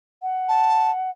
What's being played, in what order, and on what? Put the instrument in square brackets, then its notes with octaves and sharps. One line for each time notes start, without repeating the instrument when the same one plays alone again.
[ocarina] F#5
[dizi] A5